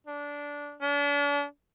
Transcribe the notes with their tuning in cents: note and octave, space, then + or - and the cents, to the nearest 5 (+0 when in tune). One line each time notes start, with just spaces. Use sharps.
D4 -15
D4 -40